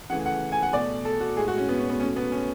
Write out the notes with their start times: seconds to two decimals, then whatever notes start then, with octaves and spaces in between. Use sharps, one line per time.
0.10 C#3 E3 A3 F#5
0.26 F#5
0.52 G#5
0.63 F#5
0.73 B2 A3 D5
1.05 A4
1.20 F#4
1.37 A2 G#3 G#4
1.48 F#4
1.57 C#4
1.69 B3
1.78 C#4
1.89 B3
2.00 B2 A3 C#4
2.16 B3
2.32 C#4